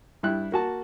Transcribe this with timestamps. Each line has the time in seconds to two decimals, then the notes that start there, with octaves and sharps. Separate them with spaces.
0.23 G2 G3 E4 F#6
0.52 A#3 F#4 A5